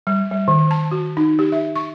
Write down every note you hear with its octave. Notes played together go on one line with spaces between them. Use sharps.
G3
G3
D#3
A5
F#4
D#4
G4
E5
C#6